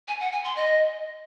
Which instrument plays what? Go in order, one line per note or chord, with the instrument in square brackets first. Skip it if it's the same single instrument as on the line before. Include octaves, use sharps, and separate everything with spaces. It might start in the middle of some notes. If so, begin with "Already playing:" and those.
[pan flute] G#5
F#5
G#5
C6
D#5